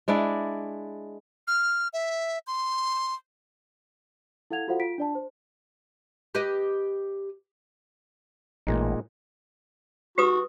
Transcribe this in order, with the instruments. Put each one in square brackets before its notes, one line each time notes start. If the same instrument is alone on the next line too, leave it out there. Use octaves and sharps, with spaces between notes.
[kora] G#3 D4 E4 D5
[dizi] F6
E5
C6
[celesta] E4 A4 F5 F#5 G#6 F7
F4 F#4 A4 C5 F5 F#5
F4 B6 D7
D4 D5 A5
C5
[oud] G4 B4 D#5
[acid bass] A1 [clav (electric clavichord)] A#2 G#3 D#4
[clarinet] F#4 [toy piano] G4 B4 D#6